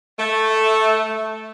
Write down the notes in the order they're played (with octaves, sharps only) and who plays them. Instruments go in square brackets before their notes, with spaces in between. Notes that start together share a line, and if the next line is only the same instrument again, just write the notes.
[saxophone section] A3